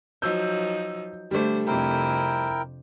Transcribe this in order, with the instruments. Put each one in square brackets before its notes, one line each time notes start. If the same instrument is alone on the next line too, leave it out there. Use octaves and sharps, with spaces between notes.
[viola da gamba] F3 F#3 D#4 [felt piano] E6 G6
[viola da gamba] D3 D4 C5 [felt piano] G3 A3
[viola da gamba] F2 C3 C5 [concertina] E4 A#4 G5